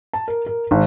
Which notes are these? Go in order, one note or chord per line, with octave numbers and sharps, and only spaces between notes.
A5
A#4
A#4
G#1